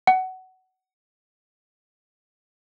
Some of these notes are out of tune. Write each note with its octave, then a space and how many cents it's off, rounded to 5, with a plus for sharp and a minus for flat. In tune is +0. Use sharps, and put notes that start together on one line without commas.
F#5 +20